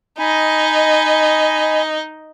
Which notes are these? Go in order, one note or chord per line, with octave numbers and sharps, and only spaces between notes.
D#4 D#5 G#5 B5